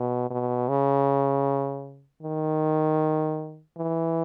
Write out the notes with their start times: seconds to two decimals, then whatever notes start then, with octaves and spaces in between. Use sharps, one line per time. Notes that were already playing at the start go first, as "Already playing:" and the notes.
Already playing: B2
0.30 B2
0.68 C#3
2.23 D#3
3.77 E3